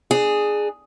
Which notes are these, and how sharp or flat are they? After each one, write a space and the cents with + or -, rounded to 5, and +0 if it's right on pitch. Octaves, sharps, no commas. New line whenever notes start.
D4 +25 G#4 +0